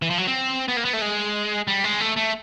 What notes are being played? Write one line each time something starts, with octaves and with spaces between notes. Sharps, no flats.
E3
F3
F#3
C4
B3
A#3
B3
A3
G#3
G3
G#3
A3
A3